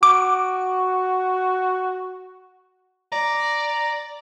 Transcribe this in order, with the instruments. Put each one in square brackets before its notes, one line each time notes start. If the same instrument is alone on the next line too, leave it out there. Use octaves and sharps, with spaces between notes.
[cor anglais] F#4 [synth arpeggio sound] D6
[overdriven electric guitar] D5 [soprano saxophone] A#5